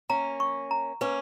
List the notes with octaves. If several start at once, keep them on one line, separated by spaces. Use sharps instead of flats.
A#3 C#4 A#5
C#6
A#5
A#3 C#4 B4